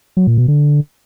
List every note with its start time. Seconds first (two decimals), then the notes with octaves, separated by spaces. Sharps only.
0.17 F#3
0.27 A#2
0.38 B2
0.48 D3